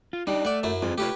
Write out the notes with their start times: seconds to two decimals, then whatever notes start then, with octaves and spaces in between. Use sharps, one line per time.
0.13 F4
0.27 G3 D4 D#4
0.45 A3 D5 F#5
0.63 F#2 F#3 E4
0.82 F2 C4 F4 G#4
0.98 A3 F4 G4 B4 C#5